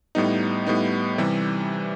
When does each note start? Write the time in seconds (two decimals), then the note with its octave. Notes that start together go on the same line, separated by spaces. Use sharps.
0.15 A2 G3 B3 D#4
0.66 A2 G3 B3 D#4
1.18 C3 E3 G3